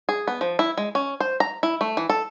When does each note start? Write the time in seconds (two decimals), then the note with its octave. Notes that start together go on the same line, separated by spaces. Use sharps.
0.09 G#4
0.28 B3
0.41 F3
0.59 E4
0.78 G#3
0.95 C#4
1.20 C5
1.40 A#5
1.63 E4
1.81 A3
1.97 E3
2.10 A4